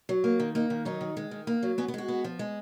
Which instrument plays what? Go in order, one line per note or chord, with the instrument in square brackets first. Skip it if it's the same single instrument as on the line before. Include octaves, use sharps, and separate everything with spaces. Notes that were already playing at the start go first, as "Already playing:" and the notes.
[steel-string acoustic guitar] F#3
A#3
D#3
A#3 D#4
D#3
F#3 D#4
D#3
G#3
D#3
A#3
F#3
B3 C#4
B3
G#3 F#4
B3
F3
G#3